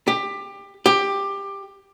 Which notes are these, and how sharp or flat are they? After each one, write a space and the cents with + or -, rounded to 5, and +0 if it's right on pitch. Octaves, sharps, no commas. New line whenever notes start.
G4 +20
G4 +15